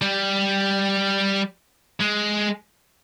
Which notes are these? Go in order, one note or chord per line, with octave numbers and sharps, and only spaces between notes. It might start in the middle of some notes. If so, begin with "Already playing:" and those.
G3
G#3